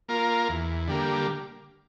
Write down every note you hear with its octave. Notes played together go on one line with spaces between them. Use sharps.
A#3 F4 A#4
E2
D3 G3 A#3